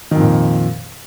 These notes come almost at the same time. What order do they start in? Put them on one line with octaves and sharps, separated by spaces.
D#3 F2 A#2